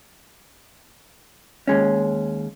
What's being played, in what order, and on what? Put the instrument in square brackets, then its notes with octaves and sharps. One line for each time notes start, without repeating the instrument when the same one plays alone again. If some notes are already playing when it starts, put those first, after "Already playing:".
[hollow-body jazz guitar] D#2 G#3 C#4